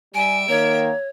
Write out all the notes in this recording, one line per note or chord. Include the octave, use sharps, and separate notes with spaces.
G3 E5 G#5 D7
D#3 A#3 C#5